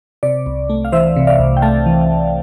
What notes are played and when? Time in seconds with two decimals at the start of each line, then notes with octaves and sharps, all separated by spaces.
0.23 C3 D5
0.46 C2
0.70 A3
0.85 F5
0.92 E3 C5 E5
1.16 C3
1.27 D5 F5
1.39 C2
1.57 G5
1.62 A3 F5 A5
1.86 E3